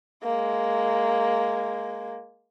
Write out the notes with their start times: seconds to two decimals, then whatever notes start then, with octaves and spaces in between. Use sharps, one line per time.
0.23 G#3 A#3